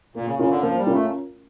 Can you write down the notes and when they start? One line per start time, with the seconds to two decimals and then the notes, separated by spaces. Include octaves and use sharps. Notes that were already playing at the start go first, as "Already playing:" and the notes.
0.15 A#2 A#3
0.27 C#3
0.39 C#3 C#4 F4 A#4
0.50 D3
0.62 F3 A#3
0.79 G3
0.87 C#4 F4 A#4
0.94 A3